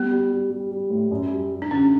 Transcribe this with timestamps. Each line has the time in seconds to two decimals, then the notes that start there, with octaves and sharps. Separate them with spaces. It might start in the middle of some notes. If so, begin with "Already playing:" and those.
Already playing: G3 B3
0.11 G3
0.31 G3
0.50 G3
0.71 G3
0.90 A2
1.11 F#2
1.31 G3
1.51 G3
1.62 D4
1.71 D3 C#4